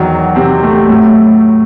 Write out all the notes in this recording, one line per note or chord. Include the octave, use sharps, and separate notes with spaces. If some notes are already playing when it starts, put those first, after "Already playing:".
Already playing: E2 D#3 F#3
C3 C4
A3
A2 F#3